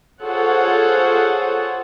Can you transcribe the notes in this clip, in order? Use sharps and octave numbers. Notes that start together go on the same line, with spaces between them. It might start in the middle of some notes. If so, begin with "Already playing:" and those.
F4 G#4 A4 C5 C#5 F#5